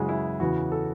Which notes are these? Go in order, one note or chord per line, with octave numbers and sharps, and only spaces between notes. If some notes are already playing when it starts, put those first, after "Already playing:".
Already playing: F#2 C#3 E3 G#3 F#4 G#4
E4
E2 C#3 E3 F#4
A4